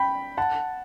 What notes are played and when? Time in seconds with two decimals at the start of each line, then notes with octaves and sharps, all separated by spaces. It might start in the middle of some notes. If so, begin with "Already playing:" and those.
Already playing: G5 B5
0.37 F#5 A5